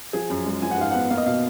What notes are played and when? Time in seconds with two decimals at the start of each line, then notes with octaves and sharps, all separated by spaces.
0.13 F3 G#4
0.30 F#2
0.46 G#3
0.62 F3 G#5
0.71 F#5
0.78 G#2 F5
0.91 F#5
0.95 B3
1.10 A#3 F5
1.17 D#5
1.26 B2 F5